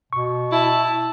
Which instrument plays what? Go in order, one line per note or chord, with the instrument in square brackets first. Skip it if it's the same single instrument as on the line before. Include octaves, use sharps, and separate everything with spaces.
[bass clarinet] B2 [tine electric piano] C#6
[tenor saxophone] E4 [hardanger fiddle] A5